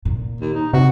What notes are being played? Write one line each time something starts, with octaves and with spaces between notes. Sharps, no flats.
A#2
D#2
D#4
C3 F#4